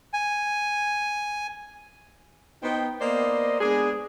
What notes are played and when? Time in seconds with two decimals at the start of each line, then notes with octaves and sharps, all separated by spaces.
0.13 G#5
2.63 B3 D#4 C5 G5
3.01 A#3 B3 C5 D5 D#5
3.61 G#3 B3 D4 G#4